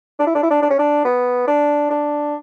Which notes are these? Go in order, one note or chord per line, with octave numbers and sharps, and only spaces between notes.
D4
E4
D4
E4
D4
D4
C#4
D4
B3
D4
D4